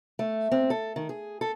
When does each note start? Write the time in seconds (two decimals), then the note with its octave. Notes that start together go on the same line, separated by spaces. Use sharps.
0.19 A3
0.51 C4
0.70 A4
0.96 D#3
1.09 G#4
1.41 A4